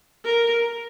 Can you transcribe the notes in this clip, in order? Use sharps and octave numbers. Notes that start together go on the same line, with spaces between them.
A#4